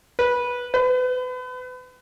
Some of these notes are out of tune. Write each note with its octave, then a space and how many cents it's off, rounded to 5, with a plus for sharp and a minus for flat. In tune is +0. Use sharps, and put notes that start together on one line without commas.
B4 -15
B4 +35